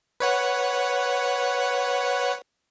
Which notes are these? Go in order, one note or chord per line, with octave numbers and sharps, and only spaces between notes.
B4 C#5 F#5